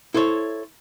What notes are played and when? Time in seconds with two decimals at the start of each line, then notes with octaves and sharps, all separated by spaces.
0.14 E4 A4 C5 C#5